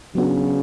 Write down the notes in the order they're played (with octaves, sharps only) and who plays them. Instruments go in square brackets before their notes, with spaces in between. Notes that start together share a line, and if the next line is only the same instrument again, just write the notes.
[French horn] C#3 [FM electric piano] F#3 B3 D4 F#4